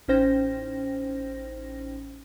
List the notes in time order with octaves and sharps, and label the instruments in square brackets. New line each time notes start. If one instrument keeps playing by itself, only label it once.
[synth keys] A1 C#4 D#4 C5 G5 A#6